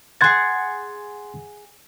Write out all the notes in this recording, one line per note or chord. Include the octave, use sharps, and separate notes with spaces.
G#4 F#5 C6 G#6 A6